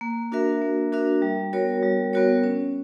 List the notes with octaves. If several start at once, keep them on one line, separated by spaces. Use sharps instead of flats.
A#3
D4 F#4 A#4 E5
A#3
D4 F#4 A#4 E5
G3
B3 F#4 A#4 C#5
G3
B3 F#4 A#4 C#5
C#4